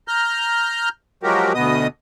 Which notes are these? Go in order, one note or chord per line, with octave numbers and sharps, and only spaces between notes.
A#5 F6 G6
F3 F#3 G#3 F#4 G4 A#4
D2 B2 B3 D#5 D#6